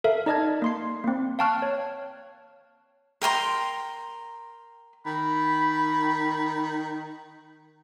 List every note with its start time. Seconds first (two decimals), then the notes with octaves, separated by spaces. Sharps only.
0.04 A4 A#4 E5 F5
0.26 D#4 D5 D#5 A5 F6 G#6
0.62 A#3 C6 C7
1.04 A#3 C4
1.39 F5 G5 A5 C#6 F6 F#6
1.62 C#5
3.22 A#4 G5 A#5 C6
5.06 D#3 B5